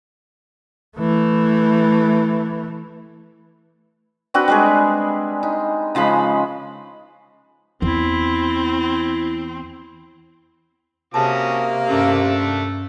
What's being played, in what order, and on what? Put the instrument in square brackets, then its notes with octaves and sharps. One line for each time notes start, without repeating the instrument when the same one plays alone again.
[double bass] E3 A3
[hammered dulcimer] C4 D4 F#4 B4
G3 G#3 G#4
D#4
C#3 F3 G#3 B5
[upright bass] E2 [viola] C4 [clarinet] E4
[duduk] C3 [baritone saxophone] A#3 [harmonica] C#4 F#4 D#6 [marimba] G#4 A5
[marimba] G2 C#4 [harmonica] A3 D4 E6